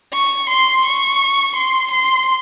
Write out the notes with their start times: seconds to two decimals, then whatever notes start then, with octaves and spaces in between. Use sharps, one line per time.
0.14 C#6
0.50 C6
0.85 C#6
1.56 C6
1.91 C6